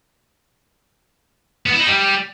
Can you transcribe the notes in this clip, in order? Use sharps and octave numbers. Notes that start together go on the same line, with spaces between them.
B3
E4
D#4
G3